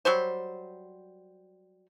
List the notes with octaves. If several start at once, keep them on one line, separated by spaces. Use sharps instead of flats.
F#3 G3 C5